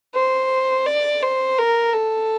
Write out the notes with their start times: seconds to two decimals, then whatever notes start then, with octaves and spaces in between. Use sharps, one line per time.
0.15 C5
0.87 D5
1.23 C5
1.58 A#4
1.94 A4